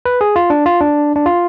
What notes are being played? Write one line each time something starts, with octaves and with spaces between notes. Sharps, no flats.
B4
G#4
F4
D4
F4
D4
D4
F4